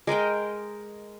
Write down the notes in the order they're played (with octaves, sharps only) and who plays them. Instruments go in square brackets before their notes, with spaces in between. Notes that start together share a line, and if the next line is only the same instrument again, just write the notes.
[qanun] G#3 A#4 D#5 G5